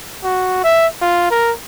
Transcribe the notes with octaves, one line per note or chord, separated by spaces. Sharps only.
F#4
E5
F4
A#4